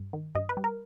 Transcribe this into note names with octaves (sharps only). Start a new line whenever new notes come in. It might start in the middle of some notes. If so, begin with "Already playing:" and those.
Already playing: G2
D#3
G2 D#5
B4
G3
A#4